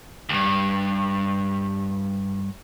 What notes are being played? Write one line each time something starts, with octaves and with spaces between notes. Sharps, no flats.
D2 G2